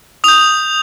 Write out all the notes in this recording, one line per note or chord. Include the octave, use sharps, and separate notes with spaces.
D#6 G6 F7